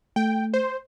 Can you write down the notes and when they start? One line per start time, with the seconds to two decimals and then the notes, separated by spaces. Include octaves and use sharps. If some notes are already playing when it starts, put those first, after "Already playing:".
0.16 A3 G5
0.54 C5